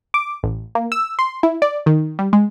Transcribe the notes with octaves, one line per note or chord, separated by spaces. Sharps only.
D6
A1
A#3
E6
C6
E4
D5
D#3
G3
G#3